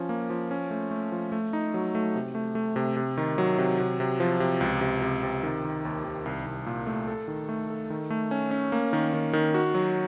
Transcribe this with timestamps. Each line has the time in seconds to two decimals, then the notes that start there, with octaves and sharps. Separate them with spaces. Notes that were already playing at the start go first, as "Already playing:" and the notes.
Already playing: F3 C#4
0.09 A#3
0.30 F3
0.51 C#4
0.71 A3
0.91 A3
1.12 F3
1.32 A3
1.53 D#4
1.74 F#3
1.95 A3
2.15 C3
2.35 A3
2.55 A3
2.76 C3
2.97 C3
3.17 D#3
3.38 F#3
3.58 C3
3.80 C3
4.00 C3
4.20 F3
4.40 C3
4.61 C#2
4.81 C3
5.02 C3
5.23 C3
5.43 D#3
5.65 D#3
5.85 D#2
6.05 D#3
6.26 C2
6.46 C2
6.66 A#2
6.87 A3
7.08 A4
7.28 D#3
7.49 A3
7.70 A4
7.90 D#3
8.10 A3
8.31 C#4
8.51 C#4
8.72 A#3
8.93 D#3
9.14 D#3
9.33 D#3
9.54 F#4
9.75 F#3